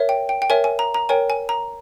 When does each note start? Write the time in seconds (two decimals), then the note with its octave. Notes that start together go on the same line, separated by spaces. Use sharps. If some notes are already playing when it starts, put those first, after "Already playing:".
Already playing: A#4 C#5 E5
0.09 G5
0.29 G5
0.42 G5
0.50 A#4 C#5 E5 G#5
0.64 G#5
0.79 A#5
0.94 A#5
1.09 A#4 C#5 G5 G#5
1.30 G#5
1.49 A#5